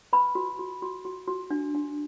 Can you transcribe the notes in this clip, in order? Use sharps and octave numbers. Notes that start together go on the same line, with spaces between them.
B4 B5
F#4
F#4
F#4
F#4
F#4
D4
D4